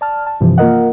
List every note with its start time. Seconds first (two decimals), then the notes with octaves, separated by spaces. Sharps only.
0.01 D5 A5 F6
0.27 A5
0.41 G2 C3 E3 F3
0.58 A#3 F4 A#4 D#5 F#5